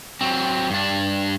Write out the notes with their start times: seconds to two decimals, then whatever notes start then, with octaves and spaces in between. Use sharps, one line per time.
0.21 F#3 C4
0.70 G2 D4